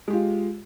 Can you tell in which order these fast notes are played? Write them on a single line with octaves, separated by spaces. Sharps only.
G#3 G4 F4